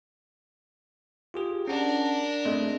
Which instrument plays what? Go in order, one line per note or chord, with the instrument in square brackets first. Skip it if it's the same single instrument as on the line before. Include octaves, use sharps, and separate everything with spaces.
[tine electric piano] F4 G4 G#4
[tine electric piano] C#4 F#5 A5 [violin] D4 A#4
[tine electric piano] A3 G#4 [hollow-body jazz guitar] C4 D#5